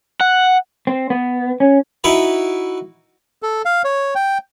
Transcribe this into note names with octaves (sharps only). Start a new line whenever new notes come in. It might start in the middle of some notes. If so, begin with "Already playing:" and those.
F#5
C4
B3
C#4
D#4 E4 F#4 B4
A4
F5
C#5
G5